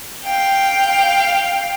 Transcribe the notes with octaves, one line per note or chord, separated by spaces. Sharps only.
F5 G5